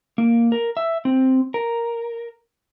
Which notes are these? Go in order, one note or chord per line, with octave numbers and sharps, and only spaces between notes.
A#3
A#4
E5
C4
A#4